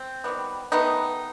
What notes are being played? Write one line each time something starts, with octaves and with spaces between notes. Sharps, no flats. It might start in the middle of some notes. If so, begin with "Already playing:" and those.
Already playing: C4
D#3 G3 B3
D#3 A3 B3 D#4